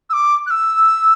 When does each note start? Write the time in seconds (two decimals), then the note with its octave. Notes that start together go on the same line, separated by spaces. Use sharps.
0.10 E6
0.13 D6
0.47 F#6
0.50 E6